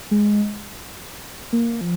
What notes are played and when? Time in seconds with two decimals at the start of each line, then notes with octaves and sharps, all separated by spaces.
0.11 G#3
1.53 A#3
1.81 F3